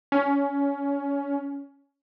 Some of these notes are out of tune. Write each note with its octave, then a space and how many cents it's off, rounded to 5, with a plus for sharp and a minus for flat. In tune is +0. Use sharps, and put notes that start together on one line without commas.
C#4 +20